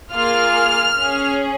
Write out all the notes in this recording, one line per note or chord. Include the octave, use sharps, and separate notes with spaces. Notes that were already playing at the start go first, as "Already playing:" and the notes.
A#3 F4 G#4 F6
C#4 G#4